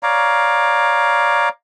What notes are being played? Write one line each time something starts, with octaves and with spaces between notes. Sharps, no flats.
C#5 D5 F5 A#5